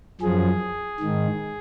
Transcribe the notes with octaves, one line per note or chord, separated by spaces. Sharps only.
F#2 F3 G#4
G#2 D#3